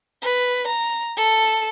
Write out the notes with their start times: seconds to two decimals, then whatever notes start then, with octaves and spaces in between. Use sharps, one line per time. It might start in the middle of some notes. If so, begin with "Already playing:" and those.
0.23 B4
0.67 A#5
1.17 A4